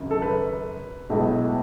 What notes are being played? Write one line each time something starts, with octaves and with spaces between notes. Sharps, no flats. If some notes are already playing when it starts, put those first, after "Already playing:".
Already playing: G#1 F#2 C#3
A4
B4
B1 A2 G#3 B3